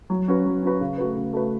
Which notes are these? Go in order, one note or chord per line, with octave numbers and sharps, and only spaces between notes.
F#3
C#4 F#4 B4
F#3
C#4 F#4 B4
C#3
A3 F#4 B4
C#3
A3 F#4 B4